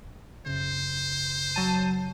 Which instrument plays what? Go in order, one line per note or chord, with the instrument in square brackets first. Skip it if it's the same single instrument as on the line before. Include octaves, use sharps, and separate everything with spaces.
[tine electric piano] F#2 C#3 [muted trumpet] C5
[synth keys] F#3 A5 D#7